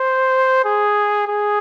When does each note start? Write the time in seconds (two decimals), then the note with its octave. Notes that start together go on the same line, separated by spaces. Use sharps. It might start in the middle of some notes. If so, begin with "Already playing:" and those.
Already playing: C5
0.65 G#4
1.28 G#4